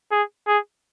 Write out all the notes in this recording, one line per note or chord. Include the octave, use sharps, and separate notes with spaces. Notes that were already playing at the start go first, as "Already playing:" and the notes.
G#4
G#4